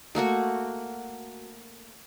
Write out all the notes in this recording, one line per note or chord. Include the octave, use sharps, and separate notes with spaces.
A3 A#3 F#4 C#6